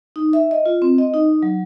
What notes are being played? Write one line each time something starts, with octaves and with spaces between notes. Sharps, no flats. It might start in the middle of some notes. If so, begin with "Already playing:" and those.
D#4
E5
D#5
F4
C4
D#5
D#4
F#3